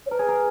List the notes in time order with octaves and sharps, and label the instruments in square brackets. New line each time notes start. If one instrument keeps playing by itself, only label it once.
[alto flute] C#5
[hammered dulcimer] A#4 [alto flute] B4
[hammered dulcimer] G#4
A#4